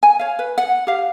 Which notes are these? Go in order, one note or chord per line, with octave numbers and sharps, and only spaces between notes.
G#5
C#5 F5
B4
F#5
G4 F5